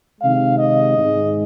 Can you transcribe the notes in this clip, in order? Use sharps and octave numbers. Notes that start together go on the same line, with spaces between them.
C3 D#3 G#3 F5
D#5
G#2 D#3 G#3